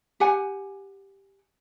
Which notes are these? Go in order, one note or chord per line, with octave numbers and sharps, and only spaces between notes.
G4 F#5 G#5